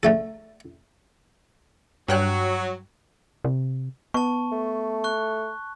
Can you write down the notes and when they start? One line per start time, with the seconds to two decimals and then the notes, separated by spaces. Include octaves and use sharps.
0.03 D3 A3 A4
2.08 G2 F#3 G5 F#6
3.44 C3
4.14 B3 A5 C#6
4.52 A3
5.04 C#6 F#6